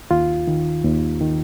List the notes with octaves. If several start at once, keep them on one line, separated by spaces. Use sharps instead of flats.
D#2 F4
D#3
D#2
D#3